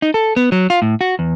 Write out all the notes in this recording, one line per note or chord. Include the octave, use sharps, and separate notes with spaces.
D#4
A4
B3
F#3
F4
A2
F#4
E2